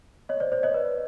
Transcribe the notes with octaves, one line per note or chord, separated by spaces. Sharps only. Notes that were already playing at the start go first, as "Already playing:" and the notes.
C#5 D#5
C5 D5
C5 D5
C#5 D#5
B4